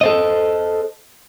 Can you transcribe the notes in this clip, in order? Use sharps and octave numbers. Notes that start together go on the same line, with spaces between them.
A4 C5 D#5